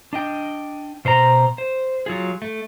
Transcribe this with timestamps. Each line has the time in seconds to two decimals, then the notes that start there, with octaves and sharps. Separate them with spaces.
0.13 D4 D#5 G5
1.05 B2 C5 C#5 A#5
1.58 C5
2.06 F#3 F4 G#4
2.42 A3